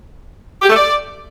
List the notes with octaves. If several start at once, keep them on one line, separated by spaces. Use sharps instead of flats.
G4
A3
D5